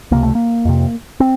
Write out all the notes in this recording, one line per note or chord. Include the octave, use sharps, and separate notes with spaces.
C#2 C3 A#3
A3
A#3
F2 C3
C4